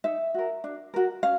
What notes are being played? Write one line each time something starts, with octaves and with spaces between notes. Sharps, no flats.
D#4 E5
F#4 A#4
D4
F#4 A#4
C#4 F5